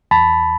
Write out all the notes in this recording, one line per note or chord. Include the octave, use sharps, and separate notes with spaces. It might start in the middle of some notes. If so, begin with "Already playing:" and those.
E2 A5 B5